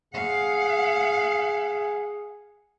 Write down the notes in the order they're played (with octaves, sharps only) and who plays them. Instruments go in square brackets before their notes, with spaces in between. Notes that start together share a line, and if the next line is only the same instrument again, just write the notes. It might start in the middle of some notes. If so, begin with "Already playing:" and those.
[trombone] G#4 [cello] F5 F#5